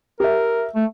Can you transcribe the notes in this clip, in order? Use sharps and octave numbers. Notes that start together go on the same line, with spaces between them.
G4 A#4 E5
A3